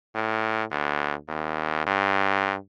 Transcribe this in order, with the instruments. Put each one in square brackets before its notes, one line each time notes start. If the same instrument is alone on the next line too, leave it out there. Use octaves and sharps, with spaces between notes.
[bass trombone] A2
D2
D#2
G2